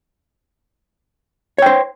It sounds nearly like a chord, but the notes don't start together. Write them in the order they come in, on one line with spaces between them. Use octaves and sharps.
C#5 G5 C5